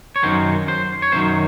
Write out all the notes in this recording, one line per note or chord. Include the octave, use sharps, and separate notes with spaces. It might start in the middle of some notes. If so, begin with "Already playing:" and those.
C#5
F#2 D#3 F#3 C5
C5
C#5
F#2 D#3 F#3 C5